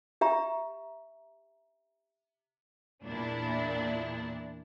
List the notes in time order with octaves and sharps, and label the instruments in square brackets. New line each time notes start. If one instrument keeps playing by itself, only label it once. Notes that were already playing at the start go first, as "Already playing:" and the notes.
[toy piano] G4 E5 A#5
[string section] E2 A#2 D4 E4